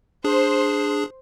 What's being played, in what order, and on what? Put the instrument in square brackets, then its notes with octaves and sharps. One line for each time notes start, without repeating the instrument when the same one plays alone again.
[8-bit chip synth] D4 G#4 [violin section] C5